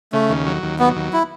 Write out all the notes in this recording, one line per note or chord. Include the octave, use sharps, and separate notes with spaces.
C#3 A3
D#2
F#3
D#2
F#3 B3
D#2
E4